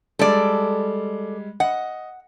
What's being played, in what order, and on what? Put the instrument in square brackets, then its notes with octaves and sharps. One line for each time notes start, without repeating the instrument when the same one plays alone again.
[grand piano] G3 G#3 [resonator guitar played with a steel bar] A4 D5
[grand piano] D#5 [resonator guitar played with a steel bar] F#5